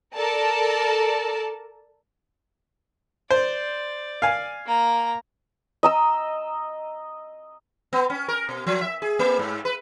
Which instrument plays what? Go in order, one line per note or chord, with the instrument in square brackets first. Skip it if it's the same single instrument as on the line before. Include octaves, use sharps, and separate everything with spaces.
[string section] A4 A#4 D5 A5
[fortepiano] C5 [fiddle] D5
[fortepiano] F5 G#5
[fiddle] A#3 A#5
[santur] D#5 A#5 E6
[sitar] B3
C#4
A#4
B2
F3
E5
G#4
A#3
G#2
B4